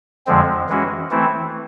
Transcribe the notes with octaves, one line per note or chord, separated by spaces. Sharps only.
F2 D3 F3 G#3 C4
E3 G#3 C#4 F#4
E3 A3 C4 E4